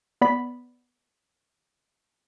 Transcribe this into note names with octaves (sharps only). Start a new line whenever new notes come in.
B3 D5 B5 B6